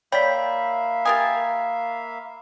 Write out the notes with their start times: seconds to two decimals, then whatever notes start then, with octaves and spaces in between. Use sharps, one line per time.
0.12 A#3 C#5 D5 E5 F5 G5 B5 B6
1.05 G4 A#4 G#5 D#6 A6